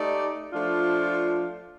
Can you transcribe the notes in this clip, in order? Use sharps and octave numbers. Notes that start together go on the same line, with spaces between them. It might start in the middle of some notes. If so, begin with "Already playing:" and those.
Already playing: A3 D#4 G4 D5
F3 A3 D4 F4